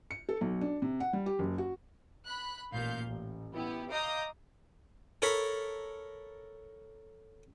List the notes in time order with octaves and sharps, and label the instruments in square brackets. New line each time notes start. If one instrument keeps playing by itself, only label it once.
[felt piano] C#7
A4
B1
D4
C3
F#5
G3
G4
F#1
F#4
[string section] B5 F#6
A1 A#2 F5 G6
A1
B3 E4 G4
D#5 F5 A#5 D6 D#6 G6
[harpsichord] A4 A#4 C#5 A5 B5